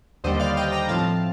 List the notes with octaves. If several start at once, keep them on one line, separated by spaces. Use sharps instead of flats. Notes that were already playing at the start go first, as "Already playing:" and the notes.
D#2 D3 G3 C5 D#5
D5 F5
D#5 G5
G5 A#5
A2 F3 C4 F5 A5